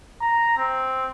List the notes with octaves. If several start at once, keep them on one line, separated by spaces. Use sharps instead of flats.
A#5
C4